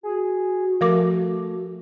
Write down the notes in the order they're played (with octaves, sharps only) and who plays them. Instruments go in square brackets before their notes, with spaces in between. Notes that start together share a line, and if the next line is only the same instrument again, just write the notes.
[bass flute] F#4 [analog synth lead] G#4
[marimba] F3 A#4 D6 [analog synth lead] A3